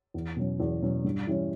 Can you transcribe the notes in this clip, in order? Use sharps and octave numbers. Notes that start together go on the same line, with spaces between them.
E2
B2 F#3 C#4
E2
B2 F#3 C#4
G2
E3 G3 C#4